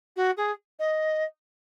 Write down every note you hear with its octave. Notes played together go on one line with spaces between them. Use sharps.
F#4
G#4
D#5